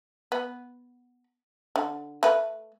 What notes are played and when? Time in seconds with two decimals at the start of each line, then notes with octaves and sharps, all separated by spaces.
0.32 B3
1.76 D3
2.23 A3 B4